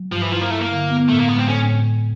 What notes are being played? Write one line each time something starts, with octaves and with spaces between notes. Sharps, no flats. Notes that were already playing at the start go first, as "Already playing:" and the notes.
Already playing: F#3
G2 F3
E3
F3 E4
A#3
A3 E4
A#3
D3
B3
A2 A3
A#3
G#3 B3
C4
A2 C#4